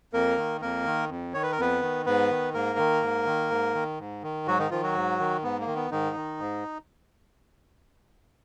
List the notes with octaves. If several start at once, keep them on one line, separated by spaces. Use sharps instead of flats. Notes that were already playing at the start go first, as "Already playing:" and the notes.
F2 A#3 A#4
D#3
F2 A#3 A#4
D#3
F2
D#3 C#5
B4
A#4
F2 B3 B4
D#3
G#2 B3 B4
D#3
G#2 A#3 A#4
D#3
G#2
D#3
G#2
D#3
G#2
D#3
G#2 F#3 F#4
D#3 D#4
D#3 F3 F4
F#3 F#4
G#2
D#3
G#2 B3
A#3
D#3
B3
G#2 D#3 D#4
D#3
G#2